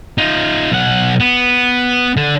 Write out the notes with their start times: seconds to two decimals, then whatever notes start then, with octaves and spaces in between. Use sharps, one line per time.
0.18 D#4 F4
0.72 B1 F#5
1.20 B3
2.17 D3